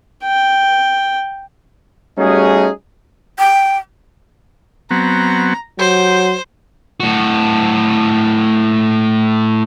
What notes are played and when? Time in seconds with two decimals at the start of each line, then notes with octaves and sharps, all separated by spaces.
0.24 G5
2.19 G3 A3 C#4 D#4 F#4 G#4
3.39 G5
4.91 F#3 B3 C4 A#5
5.79 F#3 G4 C5
7.00 A2 F#4